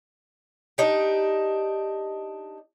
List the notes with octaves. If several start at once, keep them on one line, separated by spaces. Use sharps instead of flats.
D4 D#4 G4